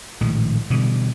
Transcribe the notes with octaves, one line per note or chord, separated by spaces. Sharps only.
A#1 A2 D#3 G#3
B2 D3 E3 G3